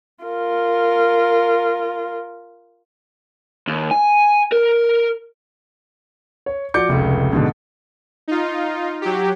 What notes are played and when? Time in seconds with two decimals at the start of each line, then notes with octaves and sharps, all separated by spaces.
0.24 F4 A#4
3.68 D#2
3.91 G#5
4.52 A#4
6.46 C#5
6.74 F3 F#4 D5 D6 G6 C#7
6.89 F1 C#2
7.33 G#2 B2 D3
8.28 D#4 F4
9.02 F#3 G4